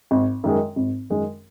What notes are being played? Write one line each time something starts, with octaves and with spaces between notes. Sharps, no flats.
G#1
F#2 D#3 G#3
G#1
F#2 D#3 G#3